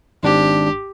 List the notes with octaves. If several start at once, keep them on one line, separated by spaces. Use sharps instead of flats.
G#1 G#2 D4 G4